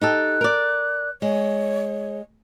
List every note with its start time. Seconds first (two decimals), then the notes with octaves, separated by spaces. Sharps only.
0.01 D#4 G4 A4 F#6
0.41 A#4 D5
1.22 G#3 C#5